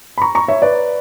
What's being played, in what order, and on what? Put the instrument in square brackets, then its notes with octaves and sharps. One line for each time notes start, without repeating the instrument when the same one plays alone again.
[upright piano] B5
A#5 C#6
A#5 C#6
C#5 E5
B4 D5